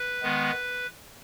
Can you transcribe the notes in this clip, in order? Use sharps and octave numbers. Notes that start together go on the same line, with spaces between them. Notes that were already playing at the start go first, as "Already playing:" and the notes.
Already playing: B4
D#3 G#3 B3